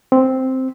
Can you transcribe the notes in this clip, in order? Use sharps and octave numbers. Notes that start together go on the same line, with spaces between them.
C4